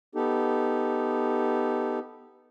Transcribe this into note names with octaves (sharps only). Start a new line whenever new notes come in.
B3 D#4 G4 A4